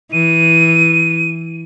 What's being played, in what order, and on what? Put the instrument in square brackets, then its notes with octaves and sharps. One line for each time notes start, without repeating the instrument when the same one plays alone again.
[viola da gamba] E3 [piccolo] D#7